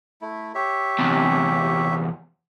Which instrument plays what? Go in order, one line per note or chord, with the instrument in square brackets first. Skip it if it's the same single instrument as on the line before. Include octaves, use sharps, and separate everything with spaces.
[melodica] A3 E4
G4 C#5 E5
[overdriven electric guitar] E2 C3